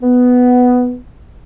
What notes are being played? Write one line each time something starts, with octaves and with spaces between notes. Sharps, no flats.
B3